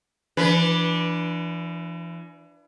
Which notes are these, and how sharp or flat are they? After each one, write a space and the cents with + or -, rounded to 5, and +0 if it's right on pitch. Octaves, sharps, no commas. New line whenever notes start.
E3 +40 D4 +0 B4 -15